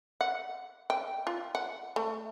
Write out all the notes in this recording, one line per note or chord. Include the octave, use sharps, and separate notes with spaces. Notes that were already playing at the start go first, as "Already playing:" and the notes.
F#5
G5
F4
F#5
A3